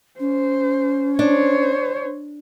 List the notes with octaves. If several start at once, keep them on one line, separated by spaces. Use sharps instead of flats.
C#4 C5
D4 C5 C#5